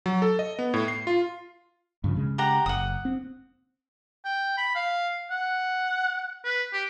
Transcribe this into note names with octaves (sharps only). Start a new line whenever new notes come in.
F#3
A4
D#5
B3
A2
C7
F4
G2 C#3 F3
C#3 G#3
G4 F#5 A#5
F#1 F#5 D#6
C4
G5
B5
F5
F#5
B4
G4